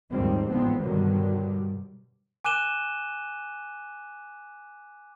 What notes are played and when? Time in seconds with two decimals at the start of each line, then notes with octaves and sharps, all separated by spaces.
0.11 D#2 G#2 D#3 F3 G3 C4
0.50 A1 G#2 D3 F3 B3 C4
0.79 G2 B2 D3 D#3 F#3 G3
2.45 G#5 D6 F#6 D#7 E7 G7